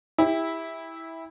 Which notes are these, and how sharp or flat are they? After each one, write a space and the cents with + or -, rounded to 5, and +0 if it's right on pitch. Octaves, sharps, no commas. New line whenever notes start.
E4 -10 G4 +30